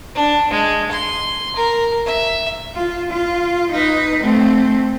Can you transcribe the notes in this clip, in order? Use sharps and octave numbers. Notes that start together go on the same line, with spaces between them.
D4
G#3
C6
A#4
E5
F4
F4
D#4 B4
A3 C4